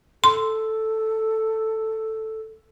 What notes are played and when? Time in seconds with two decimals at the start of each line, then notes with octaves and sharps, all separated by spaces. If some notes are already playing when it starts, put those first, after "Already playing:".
0.24 A4 C6